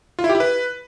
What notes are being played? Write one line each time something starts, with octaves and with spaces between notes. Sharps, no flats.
F4
E4
G4
E4
B4